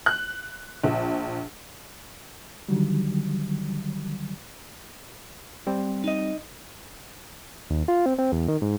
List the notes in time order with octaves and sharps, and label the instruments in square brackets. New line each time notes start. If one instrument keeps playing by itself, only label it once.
[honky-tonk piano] F#6
A#1
[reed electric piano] D3 D#3 F#3 G3
[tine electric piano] G3 C4
[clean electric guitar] D#4 D#5
[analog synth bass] D#2
F4
C4
C4
E2
D#3
G#2